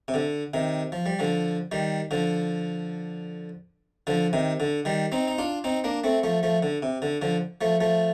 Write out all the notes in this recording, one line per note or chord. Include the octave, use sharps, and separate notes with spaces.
C3
D3
C3 D#3
F3
G3
D3 F3
D#3 G3
D3 F3
D3 F3
C3 D#3
D3
D#3 G3
C4 D#4
D#4
D4 F4
C4 D#4
A#3 D4
A3 C4
F3 A3
F3 A3
D3
C3
D3
D3 F3
F3 A3
F3 A3